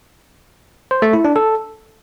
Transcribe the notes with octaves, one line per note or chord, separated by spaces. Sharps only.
C5
A3
E4
D4
A4